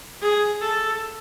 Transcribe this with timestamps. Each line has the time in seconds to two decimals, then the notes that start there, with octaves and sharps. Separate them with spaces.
0.22 G#4
0.61 A4